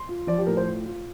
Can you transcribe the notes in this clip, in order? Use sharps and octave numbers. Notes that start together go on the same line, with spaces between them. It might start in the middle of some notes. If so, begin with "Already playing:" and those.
Already playing: C6
F4
F3 D5
G4
A2 A#4
C5
F4
F4